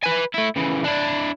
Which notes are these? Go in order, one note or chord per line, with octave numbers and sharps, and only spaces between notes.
B4 G#5
A3 E4
C#3 E3
D4 E4